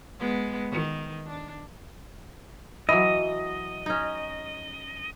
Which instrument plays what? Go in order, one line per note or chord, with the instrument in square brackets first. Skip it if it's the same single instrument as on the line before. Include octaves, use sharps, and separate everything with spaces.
[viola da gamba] G#3 B3
D#3
D4
[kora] E3 F#3 [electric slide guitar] D#5
[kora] C#4 D#4